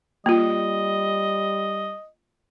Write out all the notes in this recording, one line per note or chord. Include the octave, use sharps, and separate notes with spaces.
G3 A#3 F4 D#5